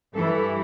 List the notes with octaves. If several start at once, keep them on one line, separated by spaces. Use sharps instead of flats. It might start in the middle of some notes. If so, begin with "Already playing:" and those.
G2 E3 G3 A4